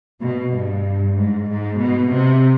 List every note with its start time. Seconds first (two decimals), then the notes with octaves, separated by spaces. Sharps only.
0.21 B2
0.53 G2
1.16 G#2
1.49 G#2
1.81 B2
2.12 C3